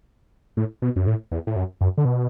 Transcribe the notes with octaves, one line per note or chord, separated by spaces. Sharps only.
A2
B2
F#2
A2
E2
A2
F#2
F#2
D3
B2